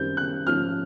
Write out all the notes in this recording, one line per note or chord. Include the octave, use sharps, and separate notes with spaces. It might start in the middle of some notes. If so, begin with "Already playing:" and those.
Already playing: F#2 D#3 G3 C4 G6
F#6
G#2 F3 A3 C#4 F6